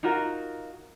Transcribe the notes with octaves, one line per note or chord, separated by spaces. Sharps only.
D#4 F4 F#4 A#4